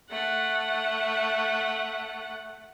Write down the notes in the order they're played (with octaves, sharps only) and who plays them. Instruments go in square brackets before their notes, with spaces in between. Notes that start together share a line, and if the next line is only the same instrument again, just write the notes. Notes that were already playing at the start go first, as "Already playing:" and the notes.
[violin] A3 F#5